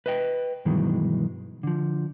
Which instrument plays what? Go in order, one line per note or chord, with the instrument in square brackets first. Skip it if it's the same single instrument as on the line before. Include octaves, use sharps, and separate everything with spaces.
[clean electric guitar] B4 D#5 G5
G2 B2 D#3 E3 F#3 G#3
D3 F3